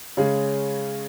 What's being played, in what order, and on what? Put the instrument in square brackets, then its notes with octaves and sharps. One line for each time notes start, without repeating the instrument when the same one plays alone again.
[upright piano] C#3 G#3 C#4 G#4